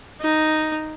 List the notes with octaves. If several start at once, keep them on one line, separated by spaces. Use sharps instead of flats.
D#4